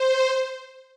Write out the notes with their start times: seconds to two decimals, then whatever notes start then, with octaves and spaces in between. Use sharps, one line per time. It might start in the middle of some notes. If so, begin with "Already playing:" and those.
Already playing: C5